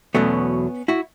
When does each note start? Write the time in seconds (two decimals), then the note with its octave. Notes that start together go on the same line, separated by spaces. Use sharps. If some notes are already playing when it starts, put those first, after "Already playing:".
0.15 E2 B2 F#3 A3 B3 C#4
0.88 E4 F#4